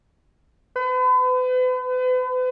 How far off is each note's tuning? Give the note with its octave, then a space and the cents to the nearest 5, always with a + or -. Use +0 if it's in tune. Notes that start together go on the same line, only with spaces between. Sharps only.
B4 +40